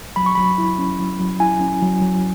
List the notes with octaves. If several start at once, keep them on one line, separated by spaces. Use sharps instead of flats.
F#3 B5
C#6
F#3 B5
E4
C#4
F#3
F#3
E4 G#5
C#4
F#3
F#3